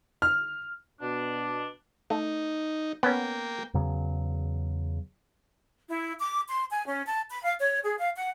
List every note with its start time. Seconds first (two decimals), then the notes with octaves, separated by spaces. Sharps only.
0.22 F6
1.01 B2 D4
2.10 A3 D#4
3.03 A#3 B3 C#4 G5
3.74 E2 C#3 F#3
5.88 E4
6.19 D6
6.48 C6
6.70 G#5
6.86 C#4
7.07 A5
7.30 B5
7.44 F5
7.60 C#5
7.84 G#4
7.98 F5
8.16 F#5